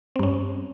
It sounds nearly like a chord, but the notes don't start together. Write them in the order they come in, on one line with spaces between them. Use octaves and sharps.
C4 G2 C#4